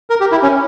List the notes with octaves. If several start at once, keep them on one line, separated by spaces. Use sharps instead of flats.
A#4
G4
E4
C#4